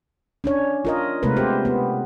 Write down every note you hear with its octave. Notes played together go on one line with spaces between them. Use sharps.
C#4 D4 C#5
F4 A#4 D#5
C3 G#3 A3 B3 A#4 B4
G4 C5
B3